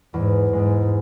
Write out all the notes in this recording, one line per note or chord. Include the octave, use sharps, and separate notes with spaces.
E2 G#2
G#2 G#3